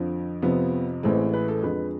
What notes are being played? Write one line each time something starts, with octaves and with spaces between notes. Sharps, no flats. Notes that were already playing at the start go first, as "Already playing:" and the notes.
Already playing: F2 D3 F3
F2 C3 F3 B3
A1 A2 E3 G#3 C4
B4
A4
F2 D3 G#3 B4